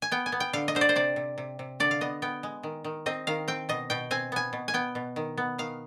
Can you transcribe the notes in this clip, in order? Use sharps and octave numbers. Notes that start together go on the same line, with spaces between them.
G#5
B3 G5
G#5
B3
G5
D3 F5
D#5
D3 C5
D5
C5
C3 D5
C3
C3
C3
D3 D5
F5
B3 D#5
B3 G5
G#3
D#3
D#3
C4 D#5
D#3 F5
C4 G5
B2 D#5
B2 G5
C4 G#5
B3 G#5
B2
G#5
B3 G5
B2
D#3
B3
D#3 F5